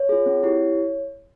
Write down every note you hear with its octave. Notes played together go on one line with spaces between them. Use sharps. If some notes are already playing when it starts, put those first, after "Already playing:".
Already playing: C#5
F4 G#4
C4
E4 G4